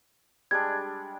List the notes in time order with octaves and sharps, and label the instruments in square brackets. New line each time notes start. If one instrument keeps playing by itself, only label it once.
[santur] G3 G#3 D4 [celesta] G#6